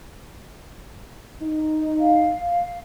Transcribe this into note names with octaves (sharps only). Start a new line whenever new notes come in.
D#4
F5